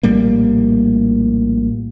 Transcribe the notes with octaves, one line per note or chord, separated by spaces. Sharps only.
A#1 A2 G3 A#3